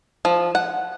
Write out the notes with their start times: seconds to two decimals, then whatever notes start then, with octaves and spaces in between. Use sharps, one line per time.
0.25 F3
0.55 F#5